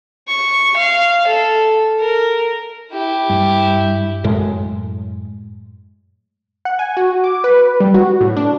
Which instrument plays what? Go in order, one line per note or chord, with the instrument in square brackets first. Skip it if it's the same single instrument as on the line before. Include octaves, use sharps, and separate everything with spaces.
[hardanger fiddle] C#6
F5
A4
A#4
E4 G4
[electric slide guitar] G2
[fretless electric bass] F#2 A2 G#3
[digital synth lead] F#5
G#5
F#4
D6
B4
G3
F#4
A2
D4